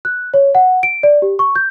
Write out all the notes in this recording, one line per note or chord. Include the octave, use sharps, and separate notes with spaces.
F#6
C#5
F#5
D7
D5
G4
C#6
G6